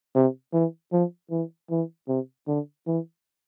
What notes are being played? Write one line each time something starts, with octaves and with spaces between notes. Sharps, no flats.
C3
E3
F3
E3
E3
C3
D3
E3